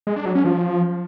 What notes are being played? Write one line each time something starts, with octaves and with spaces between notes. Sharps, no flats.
G#3
D4
F#3
C#4
F3